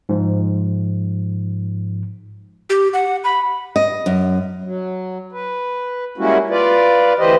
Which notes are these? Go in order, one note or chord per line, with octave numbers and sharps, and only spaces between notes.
G#2 F3
G4
F#5
B5
D#5
F#2
F#3
B4
G3 G#3 A#3 C#4 E4 F#4
F4 B4 D5
D2 E3 G4 B4 C5 D#5